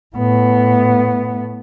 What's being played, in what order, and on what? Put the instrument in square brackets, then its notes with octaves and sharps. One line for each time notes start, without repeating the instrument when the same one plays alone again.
[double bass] A2 B3